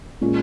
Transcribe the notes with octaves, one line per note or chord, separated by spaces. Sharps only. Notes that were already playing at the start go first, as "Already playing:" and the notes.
A#2 G#3 C#4 F4